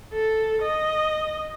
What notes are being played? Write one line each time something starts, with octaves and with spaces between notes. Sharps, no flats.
A4
D#5